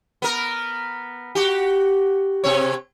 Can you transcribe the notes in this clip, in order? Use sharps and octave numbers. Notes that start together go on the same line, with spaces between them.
B3 A#4
F#4 G4
C3 C4 C#5